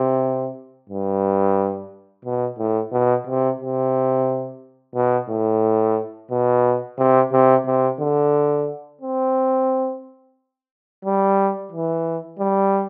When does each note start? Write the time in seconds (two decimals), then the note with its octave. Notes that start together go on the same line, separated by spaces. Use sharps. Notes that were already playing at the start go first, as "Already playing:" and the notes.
Already playing: C3
0.89 G2
2.25 B2
2.58 A2
2.92 B2
3.27 C3
3.60 C3
4.95 B2
5.29 A2
6.31 B2
6.98 C3
7.32 C3
7.66 C3
8.00 D3
9.01 C4
11.04 G3
11.72 E3
12.39 G3